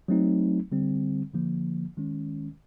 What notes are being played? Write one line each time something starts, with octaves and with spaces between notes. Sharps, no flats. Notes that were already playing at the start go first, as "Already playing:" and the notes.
F#3 A3 C4 D#4
D3 G3 C4
D3 F3 A#3
D#3 G#3 C#4